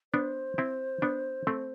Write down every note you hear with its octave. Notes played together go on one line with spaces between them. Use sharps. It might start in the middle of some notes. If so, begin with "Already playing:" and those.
B3 D4 C5
C4 E4
B3 D4
A3 C4